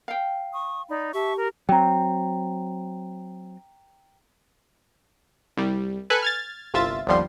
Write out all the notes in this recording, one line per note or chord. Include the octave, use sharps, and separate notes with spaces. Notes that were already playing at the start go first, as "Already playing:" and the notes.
F5 G5
C#6 D#6
D#4 D5 B5
G4 E5 A5 C#6
A#4
F#3 C4 G5 A#5
C2 G3
A4 B4 G#5 F#6 C#7
F6 G#6 A6
G1 C2 F4 E5 A6
G1 D#2 D3 F3 G3 C6